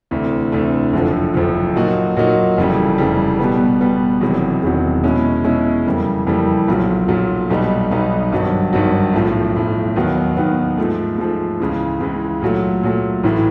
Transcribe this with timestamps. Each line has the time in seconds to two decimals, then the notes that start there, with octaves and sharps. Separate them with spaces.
0.11 D2 C3 E3 A3 D4
0.52 D2 C3 E3 A3 D4
0.93 F#1 F2 D3 F3
1.34 F#1 F2 D3 F3
1.76 A#2 F#3 A#3 D#4 F#4
2.17 A#2 F#3 A#3 D#4 F#4
2.58 F1 F2 C#3 E3 G3
2.98 F1 F2 C#3 E3 G3
3.39 B2 G3 B3
3.81 B2 G3 B3
4.21 E1 E2 C3 D#3 F#3
4.63 E1 E2 C3 D#3 F#3
5.04 B2 G#3 C#4 E4
5.44 B2 G#3 C#4 E4
5.86 F2 C#3 E3 G3 A#3
6.27 F2 C#3 E3 G3 A#3
6.68 B1 A#2 F#3
7.08 B1 A#2 F#3
7.50 B1 B2 G3 B3 D#4
7.90 B1 B2 G3 B3 D#4
8.32 G#1 G2 D#3 F#3
8.73 G#1 G2 D#3 F#3
9.14 B1 A2 F3
9.55 B1 A2 F3
9.96 D#2 D#3 F#3 B3
10.37 D#2 D#3 F#3 B3
10.78 G#2 F3 A3
11.18 G#2 F3 A3
11.60 C#2 C#3 E3
12.00 C#2 C#3 E3
12.42 A#2 F#3 A3
12.83 A#2 F#3 A3
13.24 A1 A2 E3